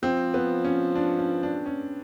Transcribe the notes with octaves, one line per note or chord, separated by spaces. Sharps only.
F3 C4
B3
C#4
D4
C#4
D4
C#4